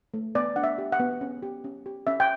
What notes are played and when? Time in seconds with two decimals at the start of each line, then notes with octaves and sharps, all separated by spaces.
0.14 A3
0.35 B3 D5
0.56 D4 F#5
0.64 E5
0.78 G4
0.92 F#5
1.00 B3
1.21 C#4
1.43 G4
1.64 C#4
1.86 G4
2.07 C#4 E5
2.20 G5